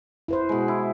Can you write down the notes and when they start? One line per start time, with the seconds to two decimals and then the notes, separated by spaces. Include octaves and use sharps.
0.28 E4 B4 C5
0.49 B2 G#3
0.68 E4